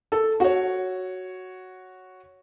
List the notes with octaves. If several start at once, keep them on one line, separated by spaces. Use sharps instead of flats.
A4
F#4 C#5